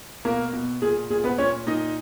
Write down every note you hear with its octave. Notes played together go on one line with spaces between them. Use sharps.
B2 A#3 A#4
B2
A#2 G#4
A#2 G#4
B3 B4
A#2 C#4 C#5
A#2 D#4 D#5